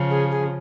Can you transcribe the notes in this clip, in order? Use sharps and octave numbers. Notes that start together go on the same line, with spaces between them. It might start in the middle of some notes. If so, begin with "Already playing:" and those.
Already playing: C#3 F3
G#4
G#4